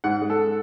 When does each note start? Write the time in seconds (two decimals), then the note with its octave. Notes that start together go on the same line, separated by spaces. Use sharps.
0.04 G#2 F#5
0.21 G#3
0.30 A4